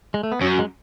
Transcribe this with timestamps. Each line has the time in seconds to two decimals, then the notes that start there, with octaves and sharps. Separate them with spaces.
0.14 G#3
0.23 A3
0.32 B3
0.41 F#2 C#4
0.59 G#3